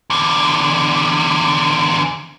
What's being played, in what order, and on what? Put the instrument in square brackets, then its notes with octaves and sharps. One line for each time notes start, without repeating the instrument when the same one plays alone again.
[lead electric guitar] E2 D3